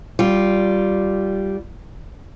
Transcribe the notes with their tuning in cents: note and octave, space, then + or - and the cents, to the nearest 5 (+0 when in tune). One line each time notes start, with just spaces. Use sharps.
G3 -10 F4 +0